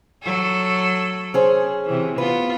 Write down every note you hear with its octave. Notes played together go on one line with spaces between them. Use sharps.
F#3 A4
C#4 G#4 C5
C3 E3
B3 F4 B4